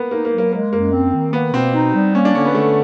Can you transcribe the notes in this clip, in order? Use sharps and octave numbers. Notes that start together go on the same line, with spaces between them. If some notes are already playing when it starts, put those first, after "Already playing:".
Already playing: A#3 B3
A#3 D#4
A#3
F#3
A#3
G#3 A#3
F#2 A#3
C4
D#3
A#3 B3
B2 C4
D#4
G3
A#3 C#4
D4
D3 C#4
B3
D3 A3